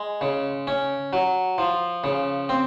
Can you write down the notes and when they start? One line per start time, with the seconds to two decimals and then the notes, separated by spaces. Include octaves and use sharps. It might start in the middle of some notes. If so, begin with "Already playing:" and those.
Already playing: G#3
0.21 C#3
0.67 C#4
1.13 F#3
1.58 F3
2.04 C#3
2.49 C4